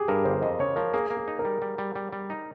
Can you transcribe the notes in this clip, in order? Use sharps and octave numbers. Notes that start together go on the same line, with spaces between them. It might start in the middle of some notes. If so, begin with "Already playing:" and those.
Already playing: G4 G#4
G2 A#4
G1 C5
F2 D#5
C#3 C#5
F3 A#4
A#3 G#4
A#3
G#4
D#4
A#4
G3
G3
G3
G3
G3
D#4